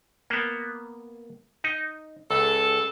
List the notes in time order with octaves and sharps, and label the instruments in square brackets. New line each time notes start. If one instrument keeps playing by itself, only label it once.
[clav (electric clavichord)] A#3 B3
D#4
[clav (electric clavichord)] C#2 [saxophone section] C#3 A4